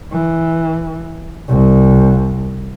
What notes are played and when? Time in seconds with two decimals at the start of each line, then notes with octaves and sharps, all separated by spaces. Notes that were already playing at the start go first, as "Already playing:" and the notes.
0.13 E3
1.49 C2